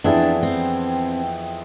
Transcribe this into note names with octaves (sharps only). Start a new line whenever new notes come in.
F2 E3 B3 D4 E4 G#4
C4